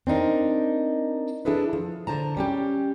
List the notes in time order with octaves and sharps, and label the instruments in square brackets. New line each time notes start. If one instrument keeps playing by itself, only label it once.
[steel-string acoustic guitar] C4 D4 D#4 A#4
D4 E4 G#4 A4 B4
F3
D3 C5 A5 A#5
G3 C#4 G4